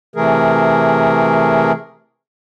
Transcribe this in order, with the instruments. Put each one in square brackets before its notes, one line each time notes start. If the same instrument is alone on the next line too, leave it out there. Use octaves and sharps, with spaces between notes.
[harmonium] C3 E3 A3 G#4 A#4